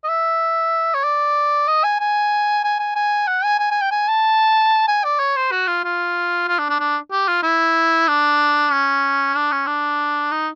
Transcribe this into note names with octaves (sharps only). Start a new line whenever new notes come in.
D#5
E5
C#5
D5
D#5
G#5
G#5
G#5
G#5
G#5
F#5
G#5
G#5
G#5
G5
G#5
A5
G#5
D5
C#5
C5
F#4
F4
F4
F4
D4
D4
D4
G4
F4
E4
D4
C#4
D4
C#4
D4
D#4